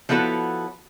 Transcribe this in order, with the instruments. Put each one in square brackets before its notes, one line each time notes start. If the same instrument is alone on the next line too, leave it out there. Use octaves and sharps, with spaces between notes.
[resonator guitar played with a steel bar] F3 B3 E4 F#4 A4 C#5